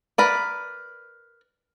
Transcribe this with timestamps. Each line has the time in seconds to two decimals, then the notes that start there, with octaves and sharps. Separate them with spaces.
0.18 A#4 B4 D5